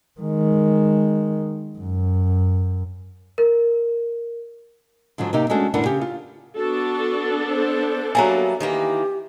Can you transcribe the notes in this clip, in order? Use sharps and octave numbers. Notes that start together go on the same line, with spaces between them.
D#3 G#3
F#2
A#4
G#2 D3 F3 F#3
C3 A#3 D#4 G4
G#3 A3 C#4 D4 F#4 A4
E2 A2 D3 D4 A#4 F#5
C#3 G4
F4
B3 D4 F#4 A4
C5
F#3 G3 A#3 E5 G#5 A#5
D#3 E3 A#3 G4